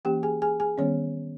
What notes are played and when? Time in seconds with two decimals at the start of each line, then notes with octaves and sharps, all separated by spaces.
0.05 E3 A#3 C#4 G4 G5
0.23 G#4 G#5
0.42 G#4 G#5
0.60 G#4 G#5
0.78 D#3 G3 B3 C#4 C#5